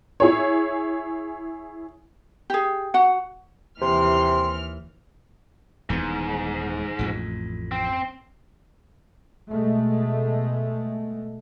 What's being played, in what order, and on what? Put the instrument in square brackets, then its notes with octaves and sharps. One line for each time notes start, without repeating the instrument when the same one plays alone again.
[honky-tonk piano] E4 G#4 C#5
[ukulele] G4 G#4
F#4 F#5
[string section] D#2 E3 F6 [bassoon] C3 [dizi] C6
[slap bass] D#1 E3 B3 [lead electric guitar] G#2
[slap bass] A1 F2 A2
[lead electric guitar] C4
[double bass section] B2 G#3 A3